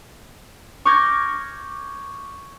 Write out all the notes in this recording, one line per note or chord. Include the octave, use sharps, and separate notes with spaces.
C#6 D6 F6 G6 G#6 A#6